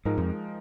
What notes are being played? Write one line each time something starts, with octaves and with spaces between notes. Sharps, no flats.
G#2 F3 G#3 D#4 A#4
F2